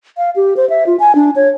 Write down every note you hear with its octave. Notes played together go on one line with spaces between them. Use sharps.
F5
G4
C5
E5
F4
G#5
D4
C#5